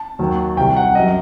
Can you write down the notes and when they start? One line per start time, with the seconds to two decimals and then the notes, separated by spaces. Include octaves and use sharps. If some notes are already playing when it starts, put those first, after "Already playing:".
Already playing: A5
0.19 D#2 D#3 F#3
0.57 C2 C3 G3 G5
0.76 F#5
0.95 F#2 F#3 D#5